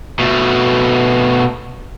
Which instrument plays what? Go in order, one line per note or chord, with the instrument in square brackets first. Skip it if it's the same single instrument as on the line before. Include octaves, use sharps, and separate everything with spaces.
[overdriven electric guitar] B2 A3